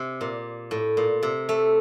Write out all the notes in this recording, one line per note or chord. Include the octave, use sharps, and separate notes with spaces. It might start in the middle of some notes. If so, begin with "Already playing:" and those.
Already playing: C3
A#2
A2
A#2
C3
A3